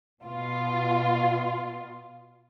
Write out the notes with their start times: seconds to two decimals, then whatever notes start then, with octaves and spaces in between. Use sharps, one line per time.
0.22 B2 F4